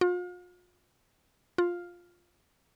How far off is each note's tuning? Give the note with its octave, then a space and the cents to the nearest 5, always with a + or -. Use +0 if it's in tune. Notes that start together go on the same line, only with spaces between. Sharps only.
F4 +40
F4 +5